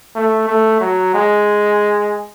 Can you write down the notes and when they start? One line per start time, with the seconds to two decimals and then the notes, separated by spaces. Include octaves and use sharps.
0.15 A3
0.47 A3
0.81 F#3
1.14 G#3